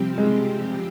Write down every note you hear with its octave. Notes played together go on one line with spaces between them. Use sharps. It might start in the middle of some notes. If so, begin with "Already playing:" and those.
Already playing: C3 F3 G3 C4 G4
G#3